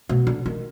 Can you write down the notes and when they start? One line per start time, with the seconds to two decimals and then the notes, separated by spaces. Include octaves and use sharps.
0.09 B2
0.27 D3
0.46 D#3